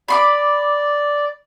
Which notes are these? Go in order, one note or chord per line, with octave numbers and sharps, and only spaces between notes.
D5 B5 C6 D6